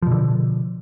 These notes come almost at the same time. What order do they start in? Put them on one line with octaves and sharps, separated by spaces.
F3 B2 D3